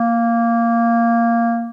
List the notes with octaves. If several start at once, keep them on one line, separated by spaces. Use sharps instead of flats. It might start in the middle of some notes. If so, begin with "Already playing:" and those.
Already playing: A#3